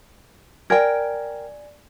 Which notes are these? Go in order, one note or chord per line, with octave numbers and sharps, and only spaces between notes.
A#4 D5 G5 G#5 G#6